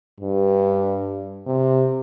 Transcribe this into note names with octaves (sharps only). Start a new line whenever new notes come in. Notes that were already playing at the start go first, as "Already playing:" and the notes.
G2
C3